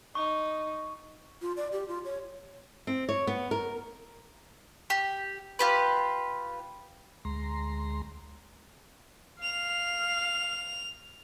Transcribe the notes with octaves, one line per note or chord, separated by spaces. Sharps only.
D#4 C#6
F4
D5
G4
F4
C#5
C4
C#5
B3
A#4
G4
F4 G4 B4
D2 G#3 A#5 C6
F5 F7